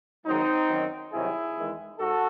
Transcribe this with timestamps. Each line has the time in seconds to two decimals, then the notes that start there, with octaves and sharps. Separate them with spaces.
0.26 G#2 D#3 F#3 C4 D#4
0.69 F#2 D#3 F#3
1.13 C2 C3 D#3 F#3 E4 G#4
1.56 E2 D#3 G#3
1.99 G#2 F#4 A4